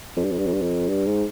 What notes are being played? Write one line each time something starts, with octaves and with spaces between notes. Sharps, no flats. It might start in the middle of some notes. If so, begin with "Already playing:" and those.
F2
G2
F2
G2
F2
G2
F2
G2
G#2